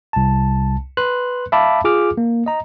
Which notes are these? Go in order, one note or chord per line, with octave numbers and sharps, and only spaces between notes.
C2 A5
B4 C6 F#6
E5 F5 A5 B5 D6
F4 G#4 D6 F6
A#3
D#5 A#5